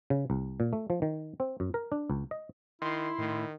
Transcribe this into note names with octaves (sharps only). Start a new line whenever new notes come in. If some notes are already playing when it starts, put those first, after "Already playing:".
C#3
C2
A#2
A3
F3
D#3
C4
F#2
A#4
D4
C#2
D#5
D#3 E4 C6
A2 D#3